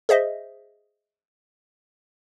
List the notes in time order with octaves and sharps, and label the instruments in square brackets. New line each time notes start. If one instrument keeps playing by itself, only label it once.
[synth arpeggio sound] G#4 C5 D#5 E5